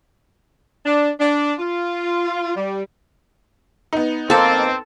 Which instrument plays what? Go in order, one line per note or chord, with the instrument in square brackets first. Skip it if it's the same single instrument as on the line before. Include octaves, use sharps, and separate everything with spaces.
[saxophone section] D4
D4
F4
G3
[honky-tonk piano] B3 D#4
[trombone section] F2 A#3 [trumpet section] C4 [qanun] A4 A5